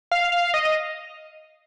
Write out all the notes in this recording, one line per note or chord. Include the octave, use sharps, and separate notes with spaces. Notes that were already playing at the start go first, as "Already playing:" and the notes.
F5
F5
D#5
D#5